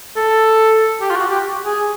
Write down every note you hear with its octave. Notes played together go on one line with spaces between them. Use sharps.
A4
G4
F4
F#4
G4
G#4